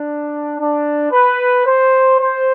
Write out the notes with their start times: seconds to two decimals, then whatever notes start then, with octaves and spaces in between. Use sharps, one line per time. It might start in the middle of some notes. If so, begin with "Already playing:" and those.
Already playing: D4
0.58 D4
1.12 B4
1.66 C5
2.20 C5